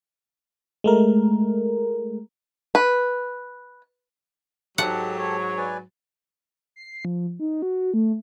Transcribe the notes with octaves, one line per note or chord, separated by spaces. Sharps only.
G#3 A3 A#4
B4
G#2 F#3 G4 A4 F#5 A5
C#5
B4 D5 G#5
C7
F3
D#4
F#4
A3